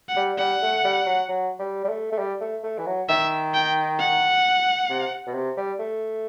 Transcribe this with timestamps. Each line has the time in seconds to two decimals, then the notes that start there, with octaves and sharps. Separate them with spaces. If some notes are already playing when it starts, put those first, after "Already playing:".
0.09 F#5
0.16 G3
0.39 G3 F#5
0.62 A3
0.84 G3
1.06 F#3
1.28 F#3
1.59 G3
1.84 G3
1.89 A3
2.12 A3
2.18 G3
2.41 A3
2.64 A3
2.78 E3
2.86 F#3
3.09 D#3 E5
3.54 G5
4.00 F#5
4.89 C3
5.27 B2
5.34 C3
5.57 G3
5.80 A3